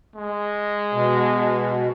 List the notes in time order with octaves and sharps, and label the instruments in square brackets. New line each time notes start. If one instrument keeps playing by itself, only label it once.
[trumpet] G#3
[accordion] B2